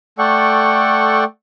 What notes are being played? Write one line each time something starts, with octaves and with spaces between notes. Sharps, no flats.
A3 A4 D5 F#5 G5 C#6